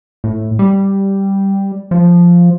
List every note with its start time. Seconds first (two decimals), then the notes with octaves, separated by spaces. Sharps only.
0.24 A2
0.59 G3
1.91 F3